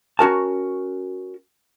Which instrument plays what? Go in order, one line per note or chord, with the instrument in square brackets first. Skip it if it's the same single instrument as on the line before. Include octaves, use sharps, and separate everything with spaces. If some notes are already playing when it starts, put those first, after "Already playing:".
[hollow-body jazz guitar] C#4 F#4 A#4 A5